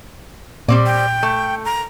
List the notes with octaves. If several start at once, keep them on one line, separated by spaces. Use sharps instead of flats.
A#2 G3 C4 D5
G5
A3
A#5